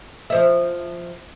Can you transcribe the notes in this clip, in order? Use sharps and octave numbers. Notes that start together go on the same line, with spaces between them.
F3 C5 E5